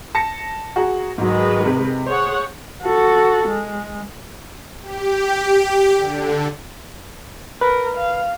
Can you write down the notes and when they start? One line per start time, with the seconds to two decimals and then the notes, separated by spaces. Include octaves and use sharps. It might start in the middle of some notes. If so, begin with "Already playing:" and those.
0.15 A5 A#6 C#7
0.76 F#4 G#4 A#5
1.18 G#2 D#3 F#3 G#3 B4
1.65 C3
2.06 G#4 C5 C#5 F#5
2.82 F#4 A4
3.47 G#3
4.82 G4
5.97 D3
7.61 A#4 B4
7.97 F5